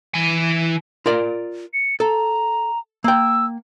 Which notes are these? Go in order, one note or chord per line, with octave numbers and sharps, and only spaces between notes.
E3 G#5
F4 A#4 D5
C#7
A4 A#5
A#3 G5 E6